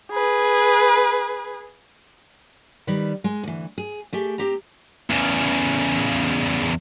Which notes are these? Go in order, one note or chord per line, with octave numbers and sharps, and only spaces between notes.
G#4 B4
D#3 G3 B4
G#3
D2 E3
G#4
A3 G4 G#4
C4 G4 A#5
E2 C#3